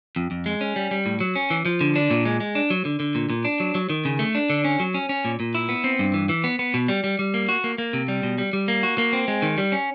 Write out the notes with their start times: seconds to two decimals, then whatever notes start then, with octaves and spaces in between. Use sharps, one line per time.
0.16 F2
0.31 F2
0.46 G#3
0.61 C#4
0.76 G3
0.91 G3
1.06 A2
1.21 F#3
1.36 C#4
1.50 E3
1.65 F3
1.81 D3
1.96 D4
2.11 A#2
2.26 G#3
2.40 G#3
2.55 D4
2.70 F#3
2.85 D3
3.00 D3
3.15 A#2
3.30 A#2
3.45 D4
3.60 F#3
3.75 F#3
3.90 D#3
4.05 C#3
4.19 A3
4.35 D4
4.50 D3
4.65 C#4
4.80 F#3
4.94 C#4
5.09 C#4
5.25 A#2
5.40 A#2
5.55 E4
5.69 B3
5.84 C4
5.99 G2
6.14 E3
6.29 E3
6.44 B3
6.59 B3
6.74 B2
6.88 G3
7.04 G3
7.19 G3
7.34 A#3
7.49 F#4
7.64 A#3
7.78 A#3
7.93 C3
8.08 G3
8.23 B2
8.38 G3
8.53 G3
8.68 A#3
8.83 F#4
8.98 A#3
9.13 C4
9.28 G#3
9.42 D#3
9.58 G3
9.72 C#4